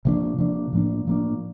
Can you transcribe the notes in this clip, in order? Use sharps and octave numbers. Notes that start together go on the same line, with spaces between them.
C3 F3 A#3 D4
C3 F3 A#3 D4
A2 F3 A#3 D4
A2 F3 A#3 D4